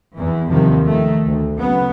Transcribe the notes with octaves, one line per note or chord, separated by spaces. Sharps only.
E2 E3
D#2 C3 D#3 F3 G3
D#3 A3
D2
C#3 F#3 B3